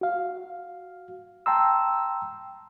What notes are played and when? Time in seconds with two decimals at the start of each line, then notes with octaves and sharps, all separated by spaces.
0.01 F#4 F5
1.46 G5 A5 A#5 C6 E6